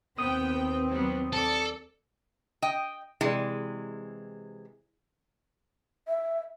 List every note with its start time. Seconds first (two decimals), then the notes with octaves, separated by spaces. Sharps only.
0.18 D#2 B3 C4 G5 D#6
0.91 F#3 G3 B3
1.33 A4 D5 C#7
2.62 D#5 G5
3.21 C3 E3 G#3 E4 G#4 D5
6.08 E5